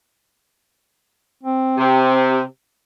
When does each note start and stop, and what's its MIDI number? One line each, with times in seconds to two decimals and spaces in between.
1.43 2.41 60
1.78 2.42 48